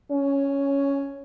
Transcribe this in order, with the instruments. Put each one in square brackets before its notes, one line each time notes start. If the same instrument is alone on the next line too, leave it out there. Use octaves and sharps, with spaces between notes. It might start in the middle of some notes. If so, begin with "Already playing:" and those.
[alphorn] C#4